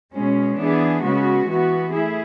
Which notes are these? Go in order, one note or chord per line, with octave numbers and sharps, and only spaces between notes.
B2 G#3 C#4
E3 B3 D4 G#4
C#3 G#3 B3 F#4
E3 B3 F#4
A3 E4 G#4